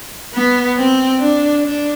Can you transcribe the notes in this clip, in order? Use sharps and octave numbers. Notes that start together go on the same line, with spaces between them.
B3
C4
D4
D4